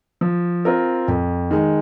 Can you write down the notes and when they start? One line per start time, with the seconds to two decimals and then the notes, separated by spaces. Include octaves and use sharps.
0.21 F3
0.65 C4 F4 A#4
1.08 F2
1.51 D#3 G#3